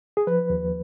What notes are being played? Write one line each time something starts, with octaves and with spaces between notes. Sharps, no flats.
G#4
F3 B4
D#2